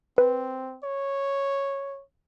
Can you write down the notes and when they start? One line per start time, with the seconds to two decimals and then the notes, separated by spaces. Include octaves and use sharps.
0.18 C4 B4
0.83 C#5